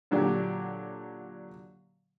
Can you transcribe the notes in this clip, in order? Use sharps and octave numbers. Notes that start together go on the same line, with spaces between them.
A#2 D3 F#3 D4 G4